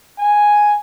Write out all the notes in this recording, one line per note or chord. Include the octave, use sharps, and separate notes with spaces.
G#5